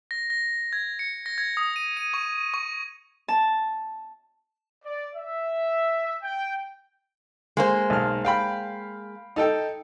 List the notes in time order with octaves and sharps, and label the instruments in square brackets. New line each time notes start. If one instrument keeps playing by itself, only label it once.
[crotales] A#6
A#6
G#6
C#7
A#6
G#6
D#6
D#7
D#7
C#6
C#6
[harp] A5
[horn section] D5
E5
G5
[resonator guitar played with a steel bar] G#3 A#3 C5
[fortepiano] B1 F6
F5 G5 B5
D#4 A4 G5